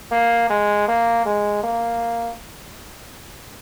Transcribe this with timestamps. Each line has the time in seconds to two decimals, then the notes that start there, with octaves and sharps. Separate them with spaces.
0.11 A#3
0.50 G#3
0.88 A#3
1.25 G#3
1.63 A#3